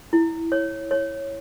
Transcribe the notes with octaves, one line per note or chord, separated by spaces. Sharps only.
E4
C#5
C#5